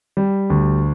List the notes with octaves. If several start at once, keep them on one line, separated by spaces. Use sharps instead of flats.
G3
D2